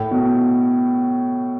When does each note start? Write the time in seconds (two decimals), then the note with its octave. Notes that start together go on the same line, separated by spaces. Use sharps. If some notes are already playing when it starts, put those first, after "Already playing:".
Already playing: A2
0.11 B2